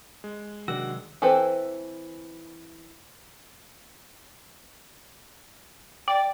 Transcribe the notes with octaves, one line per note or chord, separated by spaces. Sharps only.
G#3
C3 D#3 F#3 D4 F#4 E6
E3 C4 A4 B4 C5
D5 G5 A6